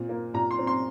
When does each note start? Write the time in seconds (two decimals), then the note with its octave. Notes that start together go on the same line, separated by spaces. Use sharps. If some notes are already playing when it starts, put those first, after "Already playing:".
Already playing: A#2 C4
0.09 A#3
0.34 A#2 A#5
0.51 C6
0.59 C4
0.67 C6